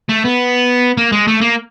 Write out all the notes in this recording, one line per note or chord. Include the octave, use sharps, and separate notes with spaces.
A3
B3
A#3
G#3
A3
A#3